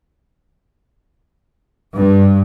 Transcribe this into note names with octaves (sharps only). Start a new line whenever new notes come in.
G2